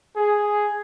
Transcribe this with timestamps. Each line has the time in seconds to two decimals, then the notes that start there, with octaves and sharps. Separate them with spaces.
0.16 G#4